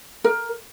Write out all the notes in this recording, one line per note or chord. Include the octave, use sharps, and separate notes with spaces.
A#4